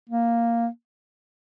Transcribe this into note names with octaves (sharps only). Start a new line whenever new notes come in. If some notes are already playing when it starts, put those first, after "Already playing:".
A#3